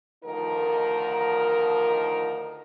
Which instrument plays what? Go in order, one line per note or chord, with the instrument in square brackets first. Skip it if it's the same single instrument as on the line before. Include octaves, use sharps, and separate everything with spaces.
[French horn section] D2 D#3 F3 D#4 A#4